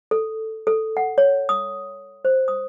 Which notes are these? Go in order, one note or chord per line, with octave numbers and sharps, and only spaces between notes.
A4
A4
F#5
C#5
D#6
C5
D#6